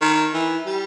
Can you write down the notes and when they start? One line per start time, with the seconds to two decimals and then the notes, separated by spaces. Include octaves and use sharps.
0.02 D#3
0.34 E3
0.66 G3